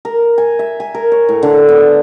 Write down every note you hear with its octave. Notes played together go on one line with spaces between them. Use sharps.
A#4
G#5
E5
G#5
A#4
C#5
A2
D3
B3